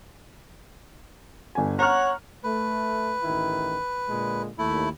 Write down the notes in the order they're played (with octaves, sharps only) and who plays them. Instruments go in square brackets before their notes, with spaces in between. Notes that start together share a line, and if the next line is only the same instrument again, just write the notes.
[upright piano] G1 G#5
[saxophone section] C#5 F#5 [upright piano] A#5 C#6 F6
[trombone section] A3 [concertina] B4
[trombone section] A1 D#3 E4
A#2 D3 G#3
[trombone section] D#2 [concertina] A3 E4